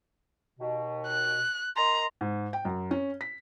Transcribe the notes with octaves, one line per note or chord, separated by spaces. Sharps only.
D#2 B2
F#6
A#4 D#5 A#5 C6
G#2
G5
F#2
C#4
B6